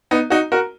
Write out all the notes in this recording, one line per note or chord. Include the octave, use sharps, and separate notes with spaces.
B3 D#4
D#4 F#4
F#4 A#4